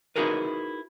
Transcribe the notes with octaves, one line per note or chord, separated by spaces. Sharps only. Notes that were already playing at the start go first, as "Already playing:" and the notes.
D#4 E4 F#4 G#4 A#4 B4